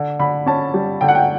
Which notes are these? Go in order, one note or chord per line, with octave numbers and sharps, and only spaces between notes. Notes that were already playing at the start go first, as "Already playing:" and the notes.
Already playing: D3
D3 B5
C#4 A5
G3
D3 G5
F#5
G5